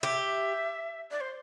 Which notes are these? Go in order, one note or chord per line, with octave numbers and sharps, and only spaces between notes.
G4 E5
D5
C5